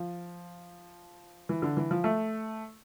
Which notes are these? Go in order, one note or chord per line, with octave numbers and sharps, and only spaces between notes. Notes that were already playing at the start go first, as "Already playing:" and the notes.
Already playing: F3
E3
D3
E3
F3
A3